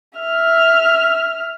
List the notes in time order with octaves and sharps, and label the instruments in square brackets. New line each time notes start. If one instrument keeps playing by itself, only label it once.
[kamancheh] E5 F6